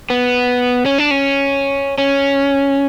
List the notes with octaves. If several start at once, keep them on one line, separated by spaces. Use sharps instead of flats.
B3
C#4
D4
C#4
C#4